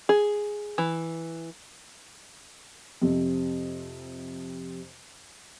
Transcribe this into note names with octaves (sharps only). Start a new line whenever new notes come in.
G#4
E3
F2 C3